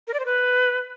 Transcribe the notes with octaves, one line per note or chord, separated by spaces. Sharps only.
A#4
D5
C5
B4